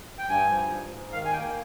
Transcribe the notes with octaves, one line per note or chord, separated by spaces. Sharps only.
G5
G2 G#5
F3
G#2
G#2
D#3 F5
G#5
A#3 G5